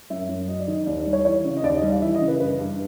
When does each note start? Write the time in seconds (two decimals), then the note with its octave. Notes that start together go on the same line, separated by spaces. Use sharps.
0.10 F#2 E5
0.29 F#2
0.48 F#3 D#5
0.60 D5
0.67 D#3 D#5
0.86 D#2 D5
1.00 D5
1.06 G3
1.13 C#5
1.25 E3 C#5
1.45 C#3
1.57 D#5
1.63 D#2 D5
1.77 D#5
1.82 G3
1.89 F5
2.02 E3 E5
2.15 D#5
2.21 C#3
2.28 B4
2.40 G2 B4
2.59 G2